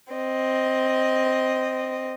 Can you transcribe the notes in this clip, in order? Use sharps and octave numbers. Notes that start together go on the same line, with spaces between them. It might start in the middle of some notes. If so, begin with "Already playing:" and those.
C4 D#5